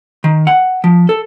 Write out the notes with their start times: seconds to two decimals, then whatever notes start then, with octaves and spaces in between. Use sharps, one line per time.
0.24 D#3
0.47 F#5
0.84 F3
1.09 A4